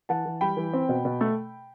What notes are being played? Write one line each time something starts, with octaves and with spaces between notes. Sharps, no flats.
E3 F#5 A5
E3
G3 G5 B5
E3
C4
B2
B2
A3